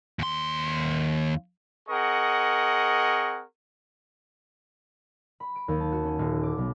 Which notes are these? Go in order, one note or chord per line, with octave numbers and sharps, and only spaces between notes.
D#2 C6
C4 G#4 A#4 D#5 F#5 C#6
B5
D7
D#2
A5
F#4
C#4
D#1
D6
B1